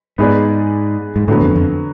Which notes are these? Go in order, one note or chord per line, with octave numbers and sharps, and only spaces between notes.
G#2 B3 D#4 G#4 B4 D5
G#2
A2 D3 F#3 B3
F2
F2